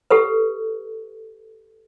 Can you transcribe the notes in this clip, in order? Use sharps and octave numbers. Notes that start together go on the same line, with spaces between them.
G4 A4 B4